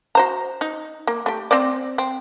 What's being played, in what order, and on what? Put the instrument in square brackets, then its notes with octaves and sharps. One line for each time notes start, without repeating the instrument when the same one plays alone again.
[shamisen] F#4 C5 A#5
D#4
A#3
A3 G4
C4 C5 D5
C4